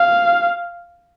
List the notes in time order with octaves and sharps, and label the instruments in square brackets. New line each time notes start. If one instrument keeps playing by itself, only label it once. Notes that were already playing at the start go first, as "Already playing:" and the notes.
Already playing: [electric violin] F5